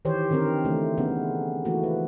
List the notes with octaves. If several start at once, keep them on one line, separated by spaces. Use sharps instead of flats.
D#3 E3 G4 C5 C#5
D3 D#3 F3 C4 A#4
C#3 E3 A3
C#3 B3
E3 F3 A3 A#3 F#4
B4